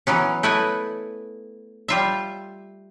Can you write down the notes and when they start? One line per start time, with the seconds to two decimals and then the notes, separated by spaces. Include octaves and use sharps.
0.07 E3 F#3 B3 C#4
0.43 A3 E4 B4 D#5 G#5
1.88 G3 F4 E5